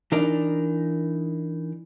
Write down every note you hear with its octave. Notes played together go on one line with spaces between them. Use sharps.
E3 D4 D#4 A#4 D5